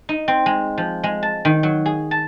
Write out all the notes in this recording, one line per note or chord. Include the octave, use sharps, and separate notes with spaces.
D#4
C4
G#3
F3
G#3
A5
D#3
F#3
G#4
A5